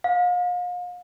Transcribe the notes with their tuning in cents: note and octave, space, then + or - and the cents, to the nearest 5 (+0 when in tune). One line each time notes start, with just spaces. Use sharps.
F5 +40